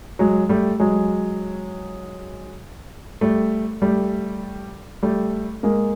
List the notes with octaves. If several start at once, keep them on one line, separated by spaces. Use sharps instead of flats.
F#3 G#3
G3 A3
F#3 G#3
G3 A3
G3 A3
G3 A3
G#3 A#3